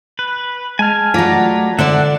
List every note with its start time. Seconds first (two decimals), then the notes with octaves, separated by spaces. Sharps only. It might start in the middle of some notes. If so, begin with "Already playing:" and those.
0.19 B4
0.79 G#3 G#5 A5 F6 G#6
1.14 F#3 A3 F4 D5 A#5
1.79 D3 C4 D4 D5 E5 F#5